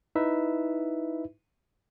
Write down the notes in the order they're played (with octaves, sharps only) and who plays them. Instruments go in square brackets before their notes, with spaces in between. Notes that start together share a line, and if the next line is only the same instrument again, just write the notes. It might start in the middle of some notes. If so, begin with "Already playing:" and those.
[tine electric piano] D#4 E4 B4 E5